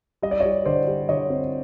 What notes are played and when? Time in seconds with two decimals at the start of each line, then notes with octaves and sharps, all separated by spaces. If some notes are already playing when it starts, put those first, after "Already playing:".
0.22 G3 D#5
0.31 D5
0.40 C#5 D#5
0.45 G3
0.65 D3 C5 D5
0.87 G3
1.09 D3 C#5 D#5
1.30 C4